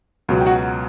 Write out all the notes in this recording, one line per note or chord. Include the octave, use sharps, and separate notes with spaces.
C#2 B2 F#3
G5
F#4 F#5